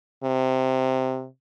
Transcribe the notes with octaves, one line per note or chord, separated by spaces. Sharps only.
C3